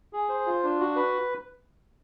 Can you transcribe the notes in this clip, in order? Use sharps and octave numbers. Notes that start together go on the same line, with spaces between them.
G#4
C5
F4
D4
F#4
B4